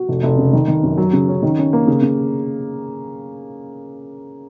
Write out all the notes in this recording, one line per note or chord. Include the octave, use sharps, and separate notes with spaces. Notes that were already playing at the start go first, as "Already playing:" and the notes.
Already playing: F#4
F1
F1
C#3
D#3
D#3
F#2
F#3
C#3
C#4
D#3
C#4
A#3
C#3
C#3